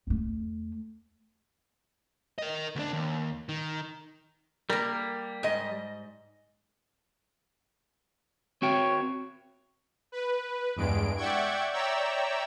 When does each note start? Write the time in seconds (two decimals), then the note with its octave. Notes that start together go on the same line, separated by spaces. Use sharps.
0.07 E2 A3
2.38 A#4 D#5
2.76 D2 D4
2.93 D#2
3.49 D#3
4.70 G3 A#3 A#4
5.43 G#2 D#5
8.62 C4 F#4 C#5 G5
10.12 B4
10.76 E2 G2 G#3 D7
11.16 D5 E5 F#5 G5 C#6 G#6
11.73 C#5 D5 E5 G5 A#5 E6